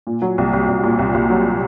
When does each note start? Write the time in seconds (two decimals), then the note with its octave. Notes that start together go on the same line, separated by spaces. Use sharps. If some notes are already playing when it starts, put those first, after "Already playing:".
0.07 A#2
0.22 F#3
0.38 C2
0.53 C2
0.68 C2
0.83 A#2
0.99 C2
1.14 C2
1.30 F#3